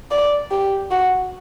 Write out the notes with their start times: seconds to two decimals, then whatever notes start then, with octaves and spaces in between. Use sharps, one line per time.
0.11 D5
0.51 G4
0.91 F#4